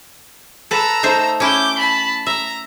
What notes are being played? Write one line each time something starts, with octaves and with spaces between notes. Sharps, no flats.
A4 B4 A#5 E6
A3 D#4 C5
C#4 E4 D6 G6
A5 B5
E5 A#5